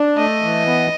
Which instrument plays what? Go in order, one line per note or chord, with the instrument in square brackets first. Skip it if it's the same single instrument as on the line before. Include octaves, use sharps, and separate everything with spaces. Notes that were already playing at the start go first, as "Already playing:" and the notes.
Already playing: [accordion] D4
[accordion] A3 [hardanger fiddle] D#5
[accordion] E3
B3